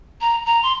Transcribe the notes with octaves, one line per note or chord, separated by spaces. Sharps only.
A#5
A#5
C6